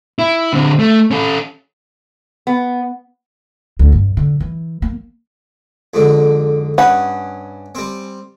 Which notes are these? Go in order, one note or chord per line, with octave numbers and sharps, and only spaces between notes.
E4
D3 C4
A3
C#4 A4
B3
D2
G2
D3
E3
A#3
F2 G#2 D3
G2 C#4 B4 D#5 F#5
G3 C4